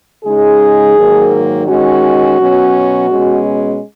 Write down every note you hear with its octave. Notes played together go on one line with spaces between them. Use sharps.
C#3 G#3 D#4 G#4
G#2 D#3 F#3 A#3
D#3 G#3 C#4 F#4
B2 F#3 C#4
B2 G#3 C#4